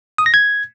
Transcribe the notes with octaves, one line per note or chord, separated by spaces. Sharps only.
D#6
A#6
G#6